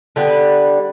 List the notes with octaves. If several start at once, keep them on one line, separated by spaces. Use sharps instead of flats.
D3 G3 B3